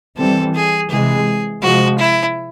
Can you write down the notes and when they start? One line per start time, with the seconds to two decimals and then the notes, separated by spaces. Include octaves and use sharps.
0.18 E3 G3 C4 A4
0.54 G#4
0.90 C3 E3 G#3 G#4
1.62 C3 F3 G#3 F#4
1.98 E4